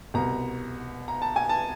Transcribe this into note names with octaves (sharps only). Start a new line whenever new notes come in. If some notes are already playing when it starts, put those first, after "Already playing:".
C2 B2 A#5
A#5
A5
G#5
A5